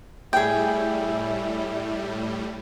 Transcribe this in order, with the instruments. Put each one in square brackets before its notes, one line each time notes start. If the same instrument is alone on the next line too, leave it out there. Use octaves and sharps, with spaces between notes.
[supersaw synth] A2 G3 [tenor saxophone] E4 [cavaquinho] G#4 G5